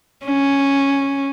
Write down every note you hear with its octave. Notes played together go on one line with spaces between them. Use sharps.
C#4